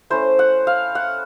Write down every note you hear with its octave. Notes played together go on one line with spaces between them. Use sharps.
A3 C#4 E4 C5
F#5
F5
F#5